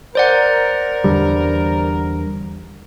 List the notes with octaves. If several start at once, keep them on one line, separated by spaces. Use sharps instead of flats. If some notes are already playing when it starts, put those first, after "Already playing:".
A#4 C5 D5 F#5
E2 D3 G3